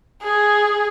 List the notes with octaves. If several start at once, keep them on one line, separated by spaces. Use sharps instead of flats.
G#4